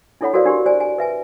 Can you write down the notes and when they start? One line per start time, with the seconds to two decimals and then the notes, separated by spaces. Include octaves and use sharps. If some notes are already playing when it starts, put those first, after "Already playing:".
0.21 D4 E4 A4 C#5 F#5 B5
0.34 F#4 A4 A#4 C5 D5 F5
0.46 D4 G4 A#4 C6
0.66 C5 D5 G#5
0.80 G#5
0.98 B4 E5 G#5